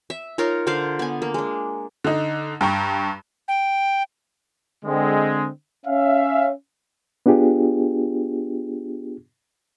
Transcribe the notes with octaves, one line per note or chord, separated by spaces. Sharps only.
E5
D#4 F4 A#4 C#5
D3 C5 D5 F5
B3 G#5
A#3
G#3 D4
D3 D#4
G2 G5 A#5 C#6
G5
D3 G#3 C4
C#4 E5 F5
B3 D4 F4 G4 G#4